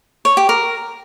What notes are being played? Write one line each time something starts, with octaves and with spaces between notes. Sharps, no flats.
C#5
G4
A#4